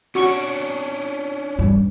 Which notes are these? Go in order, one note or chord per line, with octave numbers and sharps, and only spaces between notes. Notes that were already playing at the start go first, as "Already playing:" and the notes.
C#4 D4 F#4 C#6
G2